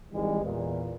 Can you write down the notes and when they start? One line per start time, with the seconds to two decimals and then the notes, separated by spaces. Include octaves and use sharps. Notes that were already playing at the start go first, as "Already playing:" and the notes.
0.12 G#1 E3 G3 G#3
0.42 E2 A#2